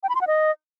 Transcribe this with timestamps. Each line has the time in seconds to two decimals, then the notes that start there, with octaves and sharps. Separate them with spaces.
0.03 G5
0.09 B5
0.15 C6
0.21 F#5
0.27 D#5